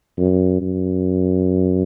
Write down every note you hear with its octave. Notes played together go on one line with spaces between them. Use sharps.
F#2
F#2